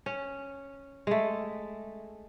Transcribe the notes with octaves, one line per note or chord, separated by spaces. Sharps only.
C#4
G#3 A3